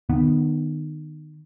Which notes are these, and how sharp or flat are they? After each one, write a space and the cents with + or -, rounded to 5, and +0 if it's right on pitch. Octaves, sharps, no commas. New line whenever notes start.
D#3 -25 B3 +0